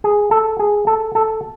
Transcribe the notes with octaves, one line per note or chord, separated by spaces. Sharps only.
G#4
A4
G#4
A4
A4